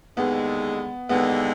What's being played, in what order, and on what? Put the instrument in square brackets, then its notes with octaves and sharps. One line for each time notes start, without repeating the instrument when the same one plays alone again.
[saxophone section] D#2 D3 G#3 [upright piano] B3
[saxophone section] D#2 D3 G#3 [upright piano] B3